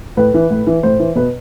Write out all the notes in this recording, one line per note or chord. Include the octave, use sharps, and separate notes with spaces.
A2 B4
E3
A2
E3
A2 C5
E3
B2 B4